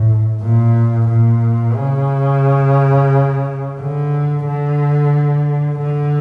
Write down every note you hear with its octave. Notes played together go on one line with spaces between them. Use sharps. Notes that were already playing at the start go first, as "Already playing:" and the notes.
Already playing: A2
A#2
A#2
C#3
D3
D3
D3